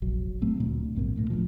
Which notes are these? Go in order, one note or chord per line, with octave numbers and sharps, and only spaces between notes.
F1 A#1 F#3
A2 F#3 A3 C4
D2 A#2
A#1 G#2 C3 A#3
D2 A2 A#3
D1 C2 A#2 F3